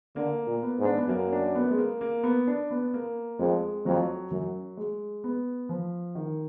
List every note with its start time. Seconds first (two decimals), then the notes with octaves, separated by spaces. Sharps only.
0.16 D3 A#3
0.47 A#2
0.63 B3
0.79 G#2
0.85 D4
0.97 B3
1.08 F#2 A#3
1.32 D4
1.55 B3
1.71 G#3
1.78 A#3
2.01 A#3
2.23 B3
2.47 D4
2.71 B3
2.94 A#3
3.39 F2 G#3
3.86 F2 F#3
4.32 F#2 F#3
4.77 G#3
5.24 B3
5.69 F3
6.15 D#3